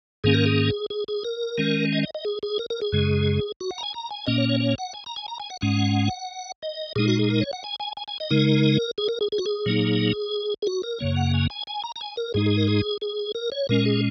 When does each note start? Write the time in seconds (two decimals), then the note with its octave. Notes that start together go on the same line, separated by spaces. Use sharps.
0.24 G#2 D#3 A#3 C#4 G#4
0.34 A#4
0.46 G#4
0.90 G#4
1.08 G#4
1.24 A#4
1.58 D#3 G#3 C#4
1.92 D#5
2.03 D#5
2.15 D#5
2.25 G#4
2.43 G#4
2.59 A#4
2.70 A#4
2.81 G#4
2.92 F#2 C#3 G#3
3.61 F#4
3.71 F#5
3.78 A#5
3.83 G#5
3.94 A#5
4.11 G#5
4.27 A#2 A#3 C#4 D#5
4.38 C#5
4.49 C#5
4.60 C#5
4.78 F#5
4.94 G#5
5.06 A#5
5.16 G#5
5.28 A#5
5.40 G#5
5.50 F#5
5.61 G#2 G#3 C#4 F#5
6.62 D#5
6.96 A#2 G#3 D#4 G#4
7.08 F#4
7.19 G#4
7.30 A#4
7.41 C#5
7.53 F#5
7.64 G#5
7.80 G#5
7.97 G#5
8.08 G#5
8.20 D#5
8.30 C#3 G#3 D#4 A#4
8.98 G#4
9.09 A#4
9.21 G#4
9.32 G#4
9.38 F#4
9.46 G#4
9.66 A#2 F#3 A#3 D#4
10.62 G#4
10.67 F#4
10.83 A#4
10.99 F#2 C#3 A#3 C#5
11.16 F#5
11.34 G#5
11.50 G#5
11.67 G#5
11.84 A#5
11.96 A#5
12.01 G#5
12.17 A#4
12.34 G#2 G#3 D#4 G#4
12.46 G#4
12.57 A#4
12.68 G#4
13.01 G#4
13.35 A#4
13.52 C#5
13.69 A#2 G#3 C#4 A#4
13.86 G#4